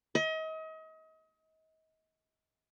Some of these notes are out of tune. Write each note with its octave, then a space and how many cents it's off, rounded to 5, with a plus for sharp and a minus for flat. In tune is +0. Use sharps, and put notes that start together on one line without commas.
D#5 +35